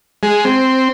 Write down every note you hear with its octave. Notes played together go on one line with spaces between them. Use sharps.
G#3
C4